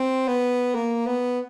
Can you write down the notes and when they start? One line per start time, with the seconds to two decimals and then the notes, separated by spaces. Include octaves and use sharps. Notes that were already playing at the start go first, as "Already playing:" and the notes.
Already playing: C4
0.28 B3
0.75 A#3
1.07 B3